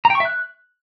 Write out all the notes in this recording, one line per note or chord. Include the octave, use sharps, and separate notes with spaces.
A#5
G5
C#6
E5
F#6